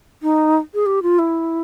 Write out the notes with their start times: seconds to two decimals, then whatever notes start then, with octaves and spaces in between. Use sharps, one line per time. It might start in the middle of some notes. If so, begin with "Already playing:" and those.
0.22 D#4
0.74 G#4
0.86 G4
1.03 F4
1.19 E4